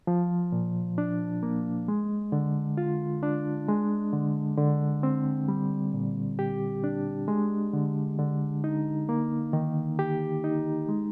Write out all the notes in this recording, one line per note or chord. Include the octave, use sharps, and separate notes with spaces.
F3
A#2
D4
A#3
G#3
D3
F4
D4
G#3
D3
D3
C4
G3
A#2
G4
D4
G#3
D3
D3
D#4
A#3
D#3
G4
D#4
G#3